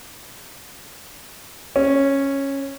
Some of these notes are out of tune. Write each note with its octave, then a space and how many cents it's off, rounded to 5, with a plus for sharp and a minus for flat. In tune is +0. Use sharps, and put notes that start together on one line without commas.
C#4 -10